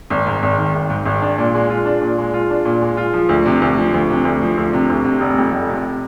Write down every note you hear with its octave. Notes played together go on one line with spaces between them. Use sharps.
G#1
G#2
G#1
D#3
G#1
G#2
G#1
D4
A#2
G#3
F4
D4
A#2
G#3
F4
D4
A#2
G#3
F4
F3
D2
C3
D2
F3
D2
C3
D2
F3
D2
C3
D2
C3
F1
F2
F1
C3